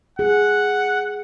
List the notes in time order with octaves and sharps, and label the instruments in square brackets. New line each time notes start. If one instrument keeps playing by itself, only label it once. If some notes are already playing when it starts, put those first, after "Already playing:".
[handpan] G#4 [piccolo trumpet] F#5